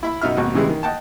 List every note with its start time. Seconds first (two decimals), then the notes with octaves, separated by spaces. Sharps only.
0.03 E4 E5 B5
0.21 F#2 B2 D#4 E5 F6
0.37 G#1 D#2 B2 F#5
0.54 A2 C#3 E3 G3 G#3
0.69 D#3
0.83 D#5 F#5 G5 A5